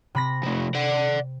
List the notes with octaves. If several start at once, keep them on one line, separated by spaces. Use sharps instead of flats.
C3 B5 A#6
F3 A3
D5 F#5